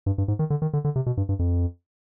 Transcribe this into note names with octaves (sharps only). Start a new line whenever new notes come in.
G2
G2
G#2
D#3
D3
D#3
D3
D3
C3
B2
G2
G2
F2